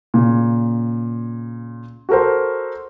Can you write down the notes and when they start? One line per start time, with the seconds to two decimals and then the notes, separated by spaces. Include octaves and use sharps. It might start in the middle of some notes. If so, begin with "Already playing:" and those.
0.14 A#2 C#3
2.09 F#4 A4 A#4 C5